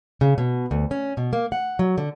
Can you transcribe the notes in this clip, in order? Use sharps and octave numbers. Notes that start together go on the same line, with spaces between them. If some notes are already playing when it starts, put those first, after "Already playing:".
C#3
B2
D2
C#4
B2
A#3
F#5
F#3
D3